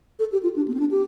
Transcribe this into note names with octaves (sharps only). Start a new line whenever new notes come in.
A4
G4
F4
D4
B3
C4
D4
G4